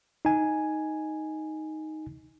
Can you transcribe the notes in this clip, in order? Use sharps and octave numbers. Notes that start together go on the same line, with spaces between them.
D#4 G#5